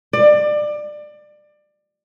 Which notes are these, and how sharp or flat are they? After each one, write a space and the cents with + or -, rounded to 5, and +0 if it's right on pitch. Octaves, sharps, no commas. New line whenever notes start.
D5 +25